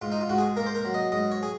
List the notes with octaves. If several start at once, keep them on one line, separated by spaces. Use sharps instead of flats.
G#2 F4
D#4
F4
G#2 F#4
G#4
A#3 A#4
C5
A#4
F#3
D#5
G#2 D#5
C#5
G#4